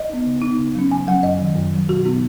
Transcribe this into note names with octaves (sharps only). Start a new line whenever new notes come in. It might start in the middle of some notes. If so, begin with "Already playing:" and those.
Already playing: D#5
B3 D#4
C#3
B3 D#4
C#3
F#3 C#4
C#3 G#5
F#3 C#4 F#5
F#2 D#5
D#3 F#3
F#2
D#3 F#3
B2 F#4
B3 D#4 F#4